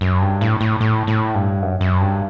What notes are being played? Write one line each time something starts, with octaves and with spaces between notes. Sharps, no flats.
F#2
G2
A2
A2
A2
A2
G2
F#2
F#2
G2